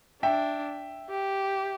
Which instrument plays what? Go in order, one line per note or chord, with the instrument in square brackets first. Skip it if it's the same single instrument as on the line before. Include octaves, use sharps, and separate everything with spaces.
[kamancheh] D4 [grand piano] E5 G5
[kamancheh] G4